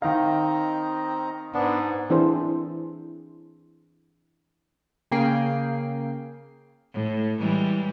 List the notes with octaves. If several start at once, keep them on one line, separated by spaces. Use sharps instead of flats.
D#3 C4 D#5 F5 A#5
G#2 B3 D4
E3 C4 D4 E4 G#4 C5
C#3 A#3 G#4 G5 C7
A2
E3 G3 G#3